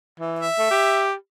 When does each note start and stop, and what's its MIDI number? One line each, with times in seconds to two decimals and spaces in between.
0.20 0.46 52
0.39 1.08 76
0.59 0.67 57
0.71 1.13 67